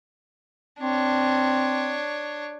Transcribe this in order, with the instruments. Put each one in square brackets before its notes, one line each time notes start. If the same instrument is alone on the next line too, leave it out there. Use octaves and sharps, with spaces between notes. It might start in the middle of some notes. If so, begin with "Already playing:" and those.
[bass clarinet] C4 [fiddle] D4 C#5